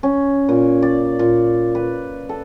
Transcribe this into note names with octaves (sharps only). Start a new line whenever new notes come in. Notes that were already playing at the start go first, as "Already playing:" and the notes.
C#4
A#2
D5
A#2
B4
A4